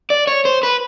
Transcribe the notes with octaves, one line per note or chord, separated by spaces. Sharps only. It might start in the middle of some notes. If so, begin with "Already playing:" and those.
D5
C#5
C5
B4